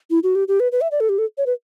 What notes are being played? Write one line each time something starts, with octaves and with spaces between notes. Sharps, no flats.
E4
F#4
G4
G4
B4
B4
E5
D5
A4
G4
A4
C#5
B4